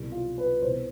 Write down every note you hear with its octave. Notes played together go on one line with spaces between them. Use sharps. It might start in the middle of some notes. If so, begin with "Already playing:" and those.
Already playing: C2 B2
F4
B4
C2 C5
B2